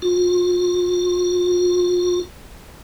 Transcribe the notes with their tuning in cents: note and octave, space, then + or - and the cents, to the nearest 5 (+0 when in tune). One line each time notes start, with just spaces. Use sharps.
F4 +35